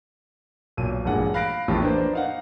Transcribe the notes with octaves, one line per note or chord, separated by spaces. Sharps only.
B1 A#2 D#7
A1 G2 A#2 G#3 F#5 G#5
F5 B5 F#6 A#6 C7 D7
A#1 E2 A2 F4 G4 A5
A#3 D4 B4 C5
D#4 F5 F#5